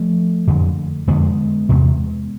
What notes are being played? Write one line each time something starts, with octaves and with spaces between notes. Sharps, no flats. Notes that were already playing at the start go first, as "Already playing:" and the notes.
Already playing: F3 A3
F2 D3
F2 D3 G#3 B3
E2 C3